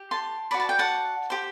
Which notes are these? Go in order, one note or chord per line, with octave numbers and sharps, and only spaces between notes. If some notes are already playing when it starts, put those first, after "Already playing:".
Already playing: G4
A5 C6
F#4 B4 D5 B5
A5
G5
F#5 A5
G4 C5